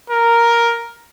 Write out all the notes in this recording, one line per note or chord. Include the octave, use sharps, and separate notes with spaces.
A#4